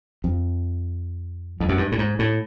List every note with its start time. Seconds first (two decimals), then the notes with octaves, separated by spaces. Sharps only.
0.24 F2
1.60 F2
1.69 F#2
1.77 G2
1.92 A2
1.99 G#2
2.19 A2